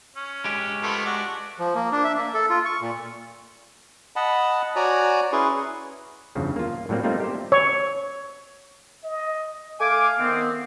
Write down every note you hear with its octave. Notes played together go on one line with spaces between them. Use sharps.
C#4
G#3 G4
F3 A3 B3
D4 F#4 D5
F3
A#3
D4
E5
A#3
A4
F4
C#6
A#2
D#5 F#5 A5 B5
F#4 C#5 D5 G#5 A#5
C#4 E4 G#4 B4 C6 C#6
E2 G2 C#3 F3
A#3 F4
A2 F#3 G3 A#3 C4
G3 A3 A#3 C4 D#4 F4
G4 C5
C#5
D#5
A3 F5 G#5 D6
D#3 B3 C4